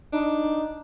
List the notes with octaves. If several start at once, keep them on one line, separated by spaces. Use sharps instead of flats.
D4 D#4